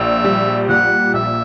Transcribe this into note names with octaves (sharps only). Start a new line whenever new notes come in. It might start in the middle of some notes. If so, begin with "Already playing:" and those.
Already playing: A#1 E5
G3
A#2 F#5
A#1 E5